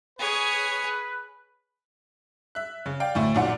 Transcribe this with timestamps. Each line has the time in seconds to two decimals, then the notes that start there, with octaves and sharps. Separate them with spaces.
0.18 G#4 B4 C#5
2.55 E5 F#6
2.86 C#3
3.00 D5 F5 G5
3.15 D2 A2 A3
3.35 A#1 F#2 A#2 D#3 D4 F#5